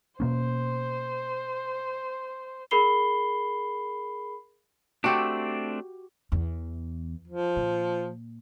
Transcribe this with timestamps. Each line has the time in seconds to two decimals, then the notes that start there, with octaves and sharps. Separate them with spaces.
0.20 B2 A#3 C#4 C5
2.71 G#4 A#4 B5 C7 G7
5.04 A3 C4 D4 F#4 G4
6.32 E2
7.27 F3
7.56 A#2